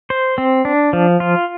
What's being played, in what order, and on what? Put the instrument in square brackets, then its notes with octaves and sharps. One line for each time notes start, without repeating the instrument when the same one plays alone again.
[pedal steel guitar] C5
C4
D4
F3
F4